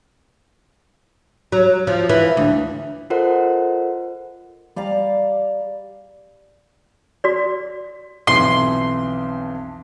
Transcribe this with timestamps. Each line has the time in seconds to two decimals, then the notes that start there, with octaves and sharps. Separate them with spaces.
1.52 F#3
1.87 F3
2.09 E3
2.37 D2
3.10 F4 A4 A#4 C5 D#5 F#5
4.76 G3 D5 F5 A#5
7.24 F#4 D5
8.27 B1 F2 E3 C6